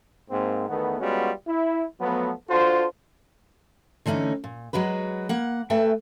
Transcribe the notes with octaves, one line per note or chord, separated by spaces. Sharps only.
G#2 A#3 C4
E2 D#3 A3 B3
G3 G#3 B3 C#4 F4 F#4
E4
F3 F#3 A3 B3
D4 F4 F#4 A4 C5
D3 E3 A3 C#4 D#4
A#2
F#3 G#3 F#4 B4
A#3 F#5
A3 A4 B4 E5 G5 G#5